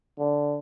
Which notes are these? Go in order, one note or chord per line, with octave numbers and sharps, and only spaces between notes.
D3